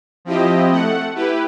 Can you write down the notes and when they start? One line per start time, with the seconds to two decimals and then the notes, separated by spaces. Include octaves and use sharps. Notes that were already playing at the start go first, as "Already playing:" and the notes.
0.25 F3 C4 E4 G4 D#5
0.72 A3 F#5
1.15 E4 G4 B4